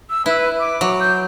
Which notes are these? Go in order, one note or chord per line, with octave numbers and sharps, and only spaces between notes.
E6
E4 B4
D6
F#3
G6